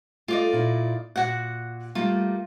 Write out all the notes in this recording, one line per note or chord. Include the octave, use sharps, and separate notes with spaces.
A3 F4 D5 D#5
A#2 E4
A#2 F#4 F#5
G3 A3 A#3 F4